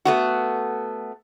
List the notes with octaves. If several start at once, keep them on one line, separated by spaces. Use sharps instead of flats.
A3 B3 F#4